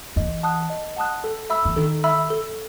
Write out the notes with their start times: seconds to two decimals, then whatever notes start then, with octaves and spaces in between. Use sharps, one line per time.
0.16 E3 D#5
0.43 F#5 A5 D#6 F#6
0.70 D#5
0.96 F#5 A5 D#6 F#6
1.24 A4
1.50 E5 B5 E6
1.65 E3
1.76 D#3 A4
2.04 E5 B5 E6
2.30 A4